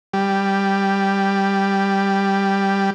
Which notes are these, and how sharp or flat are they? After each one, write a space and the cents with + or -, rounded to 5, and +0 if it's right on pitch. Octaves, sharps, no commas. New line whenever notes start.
G3 +5